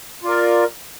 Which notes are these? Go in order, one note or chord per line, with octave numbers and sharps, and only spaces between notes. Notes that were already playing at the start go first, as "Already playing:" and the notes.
F4 A#4 D5